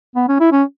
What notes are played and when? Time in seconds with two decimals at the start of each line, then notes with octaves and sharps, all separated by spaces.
0.16 B3
0.28 C#4
0.40 E4
0.52 C#4